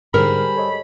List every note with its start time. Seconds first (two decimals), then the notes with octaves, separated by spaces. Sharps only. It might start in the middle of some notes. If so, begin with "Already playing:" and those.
0.14 G#2 D3 G3 G#4 A#4 C5 B5
0.56 A4 C#5 D#5